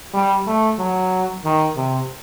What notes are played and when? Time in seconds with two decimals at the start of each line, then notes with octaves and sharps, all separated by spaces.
0.14 G3
0.47 A3
0.79 F#3
1.45 D#3
1.77 C3